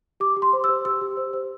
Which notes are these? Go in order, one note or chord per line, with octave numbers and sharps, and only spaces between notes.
G4 D6
G4
C6
C5
E6
C5
G4 E6
G4
C5
C5